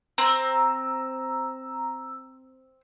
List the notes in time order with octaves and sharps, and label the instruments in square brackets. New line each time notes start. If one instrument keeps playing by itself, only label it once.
[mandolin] C4 [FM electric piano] A#5 E6